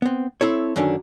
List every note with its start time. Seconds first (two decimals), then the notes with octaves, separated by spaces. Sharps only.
0.02 B3 C4
0.41 C4 E4 A4 C#5
0.76 F#2 D3 D#3 C#4 D4